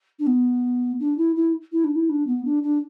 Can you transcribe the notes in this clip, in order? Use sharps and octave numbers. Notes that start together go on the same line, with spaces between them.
D4
B3
D4
E4
E4
E4
D4
E4
D4
B3
D4
D4